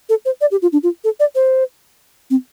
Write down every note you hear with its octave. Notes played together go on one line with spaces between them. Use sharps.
A4
C5
D5
G4
F4
D4
F4
A4
D5
C5
C4